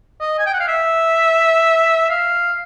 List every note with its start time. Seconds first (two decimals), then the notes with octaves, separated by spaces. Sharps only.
0.20 D#5
0.39 G#5
0.46 G5
0.54 F#5
0.60 F5
0.68 E5
2.10 F5